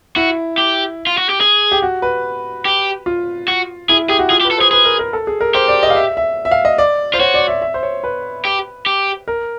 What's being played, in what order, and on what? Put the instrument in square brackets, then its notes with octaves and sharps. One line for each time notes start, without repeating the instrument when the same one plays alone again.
[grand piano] E4 [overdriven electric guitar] F#4
[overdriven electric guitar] G4
F4
F#4
G4
G#4
[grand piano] G4
F#4
B4
[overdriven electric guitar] G4
[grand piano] F4
[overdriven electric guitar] F#4
[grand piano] E4 [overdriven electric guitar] G#4
[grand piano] G4 [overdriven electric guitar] G#4
[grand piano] F#4
[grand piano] F4 [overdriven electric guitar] G#4
[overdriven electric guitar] G4
[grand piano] B4
[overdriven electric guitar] A4
[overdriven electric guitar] G#4 [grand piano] C5
[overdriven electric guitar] G#4 [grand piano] B4
[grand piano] A#4
A#4
A4
G#4
A#4
[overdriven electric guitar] G4 [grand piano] C5
[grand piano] D5
D#5
F5
E5
E5
E5
F5
D#5
D5
[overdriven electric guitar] F4 [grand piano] C5
[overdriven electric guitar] F#4 [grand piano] C#5
[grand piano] D5
E5
E5
C5
C#5
B4
[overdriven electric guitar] G4
G4
[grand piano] A#4